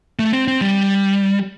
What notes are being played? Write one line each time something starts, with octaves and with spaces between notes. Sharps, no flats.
A3
C4
C4
G3